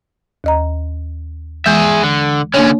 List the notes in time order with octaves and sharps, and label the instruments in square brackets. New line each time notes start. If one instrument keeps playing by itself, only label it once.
[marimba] D#2 D#5 A#5
[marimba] E3 G#3 G6 [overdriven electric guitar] G#4 E5
[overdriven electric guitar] D3
[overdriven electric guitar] D3 C#4 [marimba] A#3 D4 C#5